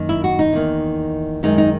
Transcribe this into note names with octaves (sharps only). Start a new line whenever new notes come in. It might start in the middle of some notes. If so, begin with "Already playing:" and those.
Already playing: F#2 D#3 A#3
E4
F#4
D#4
E2 D#3 A#3
F#2 D#3 G#3 D#4
D#4